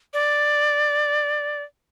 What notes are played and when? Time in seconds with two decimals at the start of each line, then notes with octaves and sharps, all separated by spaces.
0.14 D5